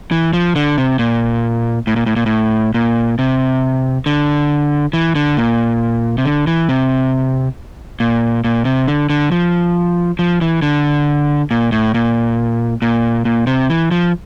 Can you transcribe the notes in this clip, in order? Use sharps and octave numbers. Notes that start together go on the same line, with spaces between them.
E3
F3
D3
C3
A#2
A2
A#2
A2
A#2
A2
A#2
C3
D3
E3
D3
A#2
C3
D3
E3
C3
A#2
A#2
C3
D3
D3
F3
F3
E3
D3
A#2
A2
A#2
A#2
A#2
C3
E3
F3